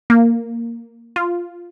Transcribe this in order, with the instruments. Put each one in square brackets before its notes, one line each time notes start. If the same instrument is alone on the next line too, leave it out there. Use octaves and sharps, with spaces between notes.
[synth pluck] A#3
F4